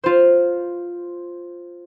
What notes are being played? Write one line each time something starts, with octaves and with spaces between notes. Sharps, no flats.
F4 C5